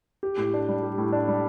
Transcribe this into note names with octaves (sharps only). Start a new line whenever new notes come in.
G4
A2
D4
G3
G4
A2
D4
G3